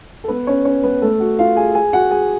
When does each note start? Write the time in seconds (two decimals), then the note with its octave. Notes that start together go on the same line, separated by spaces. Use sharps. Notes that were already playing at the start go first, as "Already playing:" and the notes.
0.24 A4
0.28 B3 B4
0.47 C#4 C#5
0.65 C#4 C#5
0.83 B3 B4
1.02 A3 A4
1.20 F#4
1.39 F4 F5
1.56 G#4 G#5
1.75 G#4 G#5
1.93 F#4 F#5
2.11 G#4 G#5